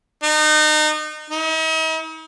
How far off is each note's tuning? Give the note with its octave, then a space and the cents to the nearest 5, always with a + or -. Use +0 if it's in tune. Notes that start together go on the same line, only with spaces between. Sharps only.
D#4 -30
D#4 +45